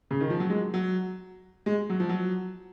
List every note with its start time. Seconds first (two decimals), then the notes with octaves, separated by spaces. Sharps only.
0.11 C#3
0.21 D#3
0.30 F3
0.40 F#3
0.50 G#3
0.74 F#3
1.66 G#3
1.90 F#3
2.00 F3
2.09 F#3